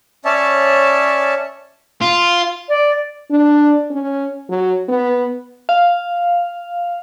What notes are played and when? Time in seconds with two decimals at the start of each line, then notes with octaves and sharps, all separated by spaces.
0.25 C#4 C#5 D5 E5 A5
2.01 F4
2.68 D5
3.31 D4
3.90 C#4
4.49 F#3
4.89 B3
5.69 F5